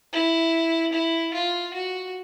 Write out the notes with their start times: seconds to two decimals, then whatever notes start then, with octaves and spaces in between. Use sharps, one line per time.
0.13 E4
0.93 E4
1.34 F4
1.74 F#4